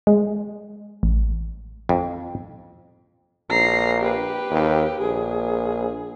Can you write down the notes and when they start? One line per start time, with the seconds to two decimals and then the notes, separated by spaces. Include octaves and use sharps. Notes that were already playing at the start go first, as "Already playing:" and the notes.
0.07 G#3
1.03 A1
1.89 F2
3.50 A#1 A#5 C7
4.01 G4 B4
4.51 D#2
5.01 A#1 G#4